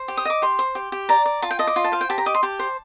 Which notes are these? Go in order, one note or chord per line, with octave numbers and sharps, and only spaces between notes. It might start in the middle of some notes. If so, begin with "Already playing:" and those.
Already playing: C5
G4
D#6
D#5 D6
G4 C6
C5
G4
G4
D5 A#5
D5
F4 A5
G5
D#5 A5
D6
F4 C6
A5
C5 F5
G5
G4 A5
A#5
D#5 D6
C6
G4 A5
C5